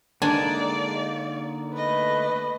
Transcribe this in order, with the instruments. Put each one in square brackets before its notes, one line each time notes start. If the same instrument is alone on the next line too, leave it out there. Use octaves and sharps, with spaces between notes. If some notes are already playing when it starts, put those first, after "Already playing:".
[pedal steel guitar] D3 A#3 D#4 [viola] G#3 D5 [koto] D4 G#5
[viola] A3 D#5 [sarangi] B4